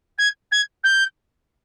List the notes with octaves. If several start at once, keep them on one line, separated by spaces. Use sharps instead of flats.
G#6
G#6
G6